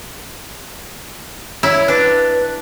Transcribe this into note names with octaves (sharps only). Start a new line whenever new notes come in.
E4 C#5
D4 B4